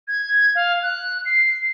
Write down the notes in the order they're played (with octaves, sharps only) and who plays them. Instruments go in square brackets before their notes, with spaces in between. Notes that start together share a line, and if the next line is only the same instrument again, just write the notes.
[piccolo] G#6
F5
F#6
C7